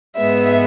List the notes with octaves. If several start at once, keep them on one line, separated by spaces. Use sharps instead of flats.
G#2 G#3 B3 E5